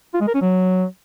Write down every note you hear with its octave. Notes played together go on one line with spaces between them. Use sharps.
F4
G#3
A#4
C#4
F#3